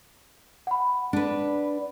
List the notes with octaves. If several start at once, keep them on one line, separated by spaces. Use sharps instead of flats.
F#5 B5
D4 B4